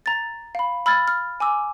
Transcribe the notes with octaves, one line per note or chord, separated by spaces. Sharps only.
A#5 A6
F5 B5
B5 E6 F6 G#6 A6
F6
G#5 D6 E6